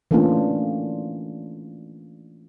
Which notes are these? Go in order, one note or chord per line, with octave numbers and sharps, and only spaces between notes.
E3 A3 A#3 C#4 D4 F4